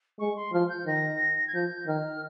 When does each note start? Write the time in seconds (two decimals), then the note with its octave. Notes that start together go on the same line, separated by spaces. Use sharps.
0.19 G#3 C#6
0.36 C6
0.52 F3 F6
0.69 G6
0.86 D#3 A#6
1.47 G#6
1.54 F3 G6
1.87 D#3 F6